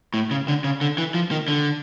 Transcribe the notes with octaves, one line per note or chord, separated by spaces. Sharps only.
A2
C#3
D3
C#3
D3
E3
F3
D#3
D3